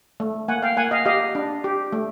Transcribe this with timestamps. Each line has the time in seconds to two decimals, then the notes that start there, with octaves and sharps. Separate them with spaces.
0.20 A3
0.48 A#3 F#5 G#5
0.62 F5 G5
0.77 A#3 F#5 G#5
0.91 D#5 F5
1.06 G4 D#5 F5
1.35 D4
1.64 G4
1.92 A3